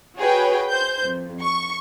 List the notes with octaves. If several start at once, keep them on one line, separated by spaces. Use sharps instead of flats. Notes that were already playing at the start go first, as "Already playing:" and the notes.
F#4 G#4 B4 C#5 G5
C5 G6
F2
C#6